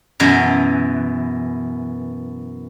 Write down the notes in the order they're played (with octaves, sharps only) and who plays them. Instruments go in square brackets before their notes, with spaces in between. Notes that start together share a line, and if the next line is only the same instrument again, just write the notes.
[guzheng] F#2 B2 E3